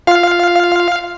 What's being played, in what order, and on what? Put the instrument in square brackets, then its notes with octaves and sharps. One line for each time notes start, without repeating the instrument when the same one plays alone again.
[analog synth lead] F4 [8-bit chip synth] F5